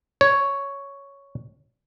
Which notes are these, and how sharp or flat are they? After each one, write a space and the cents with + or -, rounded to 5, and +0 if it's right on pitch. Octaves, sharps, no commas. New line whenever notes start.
C#5 +5